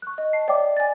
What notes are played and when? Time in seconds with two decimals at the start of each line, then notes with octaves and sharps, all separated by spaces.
0.02 C#6 F#6
0.18 D#5
0.33 A5 C7
0.48 C#5 D5 E5 G5 D6
0.77 G#5 A6